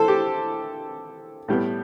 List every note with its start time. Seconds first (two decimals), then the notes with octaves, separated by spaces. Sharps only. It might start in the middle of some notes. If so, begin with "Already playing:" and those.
Already playing: E3 A4 C5
0.08 G4
1.48 A2 G3 B3